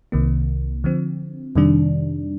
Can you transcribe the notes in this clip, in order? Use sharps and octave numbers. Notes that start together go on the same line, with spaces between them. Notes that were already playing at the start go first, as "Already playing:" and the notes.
C2 C3 D#3 A#3
D3 F3 C4
F2 C3 D#3 G3 D4